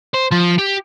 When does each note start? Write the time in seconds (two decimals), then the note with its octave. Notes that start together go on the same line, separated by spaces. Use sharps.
0.14 C5
0.32 F3
0.59 G4